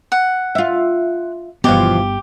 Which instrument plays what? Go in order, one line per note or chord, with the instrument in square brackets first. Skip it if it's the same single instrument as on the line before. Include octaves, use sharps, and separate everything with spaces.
[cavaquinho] F#5
[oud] F4 E5
[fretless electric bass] G1 B3 [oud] B2 E3 F3 [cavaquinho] G4